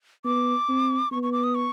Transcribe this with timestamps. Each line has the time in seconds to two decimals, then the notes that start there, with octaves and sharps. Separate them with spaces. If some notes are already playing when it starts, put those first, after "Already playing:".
0.25 B3 D6
0.69 C4
1.11 B3 C#6
1.23 C#6
1.32 D6
1.44 D#6
1.55 C#6